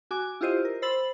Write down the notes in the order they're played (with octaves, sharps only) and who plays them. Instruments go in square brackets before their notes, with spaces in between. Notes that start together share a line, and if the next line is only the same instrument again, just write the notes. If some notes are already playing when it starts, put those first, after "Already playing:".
[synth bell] F#4 G#5 D6
E4 F4 G4 C5 D#5
A#4
C5 B5 E6 A6 F#7